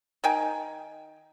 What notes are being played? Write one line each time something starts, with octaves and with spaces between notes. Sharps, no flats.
D#3 G5 G#5